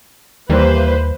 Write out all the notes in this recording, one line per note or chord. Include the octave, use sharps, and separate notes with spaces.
D#2 E3 G3 A#3 B4 C5